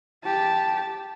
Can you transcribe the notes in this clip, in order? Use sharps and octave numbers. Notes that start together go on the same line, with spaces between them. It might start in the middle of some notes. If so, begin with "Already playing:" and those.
G4 A5